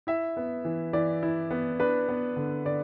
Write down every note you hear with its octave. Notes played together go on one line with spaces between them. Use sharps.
E4 E5
B3
E3
E3 D5
E4
B3
D4 B4
B3
D3
D3 D5